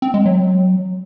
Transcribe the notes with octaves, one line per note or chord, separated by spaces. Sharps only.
C4
G#3
F#3